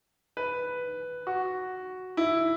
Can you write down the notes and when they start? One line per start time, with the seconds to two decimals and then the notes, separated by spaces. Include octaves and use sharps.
0.37 B4
1.27 F#4
2.17 E4